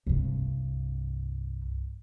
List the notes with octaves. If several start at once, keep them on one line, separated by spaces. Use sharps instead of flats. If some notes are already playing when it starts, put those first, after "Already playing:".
C2 G2